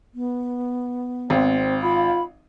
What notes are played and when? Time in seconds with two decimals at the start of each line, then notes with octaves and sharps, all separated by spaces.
0.15 B3
1.30 G#1 C4
1.82 F4 B5